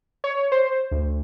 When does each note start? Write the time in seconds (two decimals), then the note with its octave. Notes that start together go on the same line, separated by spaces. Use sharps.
0.24 C#5
0.52 C5
0.91 D2